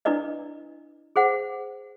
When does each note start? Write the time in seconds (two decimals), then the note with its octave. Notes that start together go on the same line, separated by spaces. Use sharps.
0.05 D4 E4 B4 D5 D#5
1.16 G#4 C5 F#5